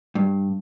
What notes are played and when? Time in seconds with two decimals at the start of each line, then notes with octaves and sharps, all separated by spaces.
0.15 G2